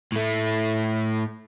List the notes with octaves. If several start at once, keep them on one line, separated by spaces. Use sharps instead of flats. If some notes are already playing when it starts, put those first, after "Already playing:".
A2 A3